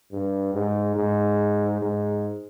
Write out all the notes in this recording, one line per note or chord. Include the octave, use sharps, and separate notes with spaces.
G2
G#2
G#2
G#2